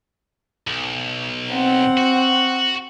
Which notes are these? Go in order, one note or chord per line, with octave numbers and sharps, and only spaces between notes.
B1
C4 F#5
F#4